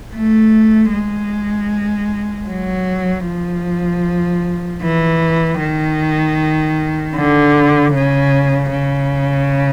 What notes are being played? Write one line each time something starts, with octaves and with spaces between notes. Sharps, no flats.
A3
G#3
F#3
F3
E3
D#3
D3
C#3
C#3